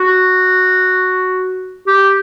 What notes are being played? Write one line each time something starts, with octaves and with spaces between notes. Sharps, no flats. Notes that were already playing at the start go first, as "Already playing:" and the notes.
Already playing: F#4
G4